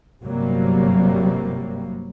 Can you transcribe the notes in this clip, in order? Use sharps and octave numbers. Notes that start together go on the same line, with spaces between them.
G1 C3 F#3 G3 A#3